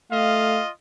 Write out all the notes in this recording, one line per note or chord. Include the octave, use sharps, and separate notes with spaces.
A3 F4 D#5 F5